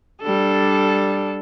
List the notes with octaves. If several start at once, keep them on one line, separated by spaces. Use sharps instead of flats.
G3 D4 A4